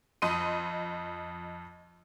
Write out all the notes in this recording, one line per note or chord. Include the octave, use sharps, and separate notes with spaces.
F2 D#5 C6 D#7